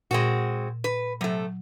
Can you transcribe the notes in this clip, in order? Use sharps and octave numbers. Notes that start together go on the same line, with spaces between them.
A#2 G#3 C4 F#4
B4
C3 F#3 A3